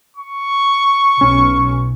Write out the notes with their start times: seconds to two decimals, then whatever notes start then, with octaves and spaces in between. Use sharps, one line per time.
0.17 C#6
1.21 B1 C#4